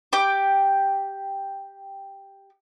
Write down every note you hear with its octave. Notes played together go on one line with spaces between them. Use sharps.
G4 G5 D6